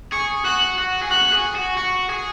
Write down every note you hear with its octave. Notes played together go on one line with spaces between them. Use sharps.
G#4 C#6
F#4 F#6
F#4
G#4
F#4 F#6
G#4
F#4
F#4 C#6
G#4